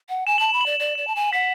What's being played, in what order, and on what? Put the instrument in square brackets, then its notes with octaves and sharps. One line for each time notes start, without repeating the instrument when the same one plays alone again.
[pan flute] F#5
[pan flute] G#5 [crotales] E7
[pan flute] A5 [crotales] F#7
[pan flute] B5 [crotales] E7
[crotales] F#7
[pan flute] D5
[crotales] E7
[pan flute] D5 [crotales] F#7
[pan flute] D5 [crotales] E7
[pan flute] A5
G#5
[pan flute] F#5 [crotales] B6